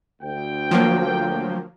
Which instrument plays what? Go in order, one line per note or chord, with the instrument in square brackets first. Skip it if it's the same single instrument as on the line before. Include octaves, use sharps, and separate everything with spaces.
[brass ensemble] D2 G5
[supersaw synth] F3 F#3 A#3